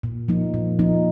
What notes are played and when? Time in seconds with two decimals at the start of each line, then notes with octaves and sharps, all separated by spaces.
0.03 A#2
0.28 F3 A#3 D#4
0.54 A#2
0.79 F3 A#3 D#4